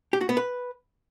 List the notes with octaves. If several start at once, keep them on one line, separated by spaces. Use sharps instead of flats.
G4
F#4
B3
B4